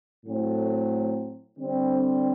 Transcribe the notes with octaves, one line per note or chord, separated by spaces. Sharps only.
A2 F#3 A3 C4
D3 G3 C4